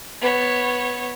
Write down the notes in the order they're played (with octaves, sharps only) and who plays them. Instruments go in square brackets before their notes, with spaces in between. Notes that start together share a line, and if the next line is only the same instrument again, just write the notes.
[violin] B3 C#5